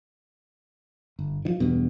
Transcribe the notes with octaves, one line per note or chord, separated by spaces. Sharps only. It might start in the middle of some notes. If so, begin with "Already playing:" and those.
G1
D#3 F3
E2 G2 B2